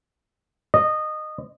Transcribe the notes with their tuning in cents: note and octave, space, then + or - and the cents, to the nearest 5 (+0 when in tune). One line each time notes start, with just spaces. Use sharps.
D#5 -20